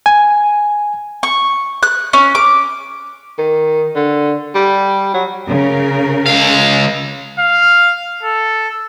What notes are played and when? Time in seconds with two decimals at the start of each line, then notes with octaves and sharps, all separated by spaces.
0.06 G#5
1.23 C#6
1.83 F#6
2.13 C#4
2.35 D6
3.38 D#3
3.96 D3
4.55 G3
5.14 F#3
5.48 C#3 A#4
6.26 C#2 F5
7.39 F5
8.23 A4